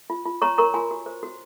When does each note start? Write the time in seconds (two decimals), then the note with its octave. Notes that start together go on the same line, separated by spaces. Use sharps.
0.10 F4
0.26 F4
0.42 C#5 A#5 C#6
0.58 A#4 A#5 C#6
0.74 F4 G#5 C6
0.91 F#4
1.06 C5
1.23 F#4